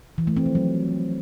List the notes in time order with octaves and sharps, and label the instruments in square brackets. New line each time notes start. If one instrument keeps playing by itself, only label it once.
[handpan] E3
A3
C4
F3
F#3